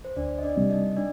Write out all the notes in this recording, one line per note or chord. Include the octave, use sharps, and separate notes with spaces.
C5
D2 D4 D5
D#5
D4 D5
C3 G3 C4
D#4 D#5
D4 D5